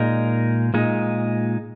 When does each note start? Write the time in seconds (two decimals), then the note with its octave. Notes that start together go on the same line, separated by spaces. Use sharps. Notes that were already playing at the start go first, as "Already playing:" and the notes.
Already playing: A#2 G#3 D#4 A#4
0.74 A#2 G#3 D#4